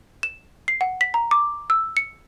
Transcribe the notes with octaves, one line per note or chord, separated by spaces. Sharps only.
E7
C7
F#5
B6
A#5
D6
E6
C#7